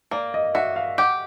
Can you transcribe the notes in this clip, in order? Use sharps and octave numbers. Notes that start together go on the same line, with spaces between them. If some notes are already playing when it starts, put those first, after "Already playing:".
A#3 D5
D#5
F#4 E5
F5
G4 F#5